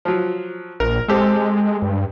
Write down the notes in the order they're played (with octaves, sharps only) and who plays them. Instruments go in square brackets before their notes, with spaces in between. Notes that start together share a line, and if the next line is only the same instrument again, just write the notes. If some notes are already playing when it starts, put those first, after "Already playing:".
[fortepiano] F3 F#3
[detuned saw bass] A#1 [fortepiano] A#4
[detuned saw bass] G#3 [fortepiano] C4 G4 A4
[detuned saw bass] G2